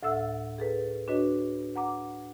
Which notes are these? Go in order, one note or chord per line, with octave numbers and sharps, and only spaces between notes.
D2 A2 A4 E5 F#5 E6
G#4 A4 B4
D4 F#4 B4 C#5 D#5
F#5 A#5 D6